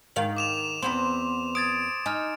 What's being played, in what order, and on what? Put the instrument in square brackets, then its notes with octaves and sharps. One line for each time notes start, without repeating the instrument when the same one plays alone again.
[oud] G#2 D#3 F5 [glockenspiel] F#7
[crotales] D6 E7 F7
[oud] E2 B3 C4 [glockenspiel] C6
[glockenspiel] D#6 G#6 A6 [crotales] D7
[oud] D#4 [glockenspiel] G#5 F6